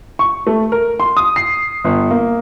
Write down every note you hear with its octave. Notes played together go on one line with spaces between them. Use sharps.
C#6
A3
A#4
C6
D#6
C7
G1
A#3